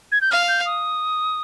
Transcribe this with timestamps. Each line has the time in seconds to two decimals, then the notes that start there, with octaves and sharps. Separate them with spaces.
0.12 G#6
0.21 G6
0.31 F5 F6
0.48 G6
0.66 D#6